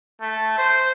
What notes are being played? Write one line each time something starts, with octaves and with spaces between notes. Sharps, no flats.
A3
C5